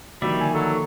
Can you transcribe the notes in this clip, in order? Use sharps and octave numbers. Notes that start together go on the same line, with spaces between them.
D3 D#3 F3 G3 A#3 F#4 D5 E5
G#5
F#3 A4